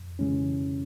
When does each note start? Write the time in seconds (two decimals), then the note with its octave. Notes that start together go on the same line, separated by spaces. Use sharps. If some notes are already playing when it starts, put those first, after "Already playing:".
Already playing: F2
0.19 C#3 E3 G#3 C#4